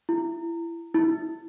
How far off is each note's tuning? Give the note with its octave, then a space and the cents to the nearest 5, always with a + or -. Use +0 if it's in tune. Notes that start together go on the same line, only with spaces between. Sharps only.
E4 +25
E4 -15